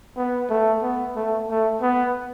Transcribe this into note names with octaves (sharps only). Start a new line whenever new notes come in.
B3
A3
B3
A3
A3
B3